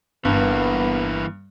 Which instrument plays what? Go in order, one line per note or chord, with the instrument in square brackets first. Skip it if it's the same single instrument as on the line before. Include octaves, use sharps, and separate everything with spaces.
[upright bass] G1 [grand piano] G2 [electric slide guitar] E3 A#3 [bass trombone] B3